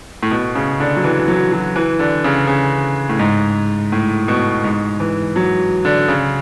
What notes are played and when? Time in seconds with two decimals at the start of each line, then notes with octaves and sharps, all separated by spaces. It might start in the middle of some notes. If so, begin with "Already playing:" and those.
0.23 A2
0.31 B2
0.55 C#3
0.80 D3
0.96 F#3
1.04 E3
1.28 F#3
1.52 F#3
1.76 E3
1.99 D3
2.24 C#3
2.47 C#3
3.09 A2
3.19 G#2
3.92 A2
4.28 B2
4.64 G#2
5.00 E3
5.36 F#3
5.85 D3
6.08 C#3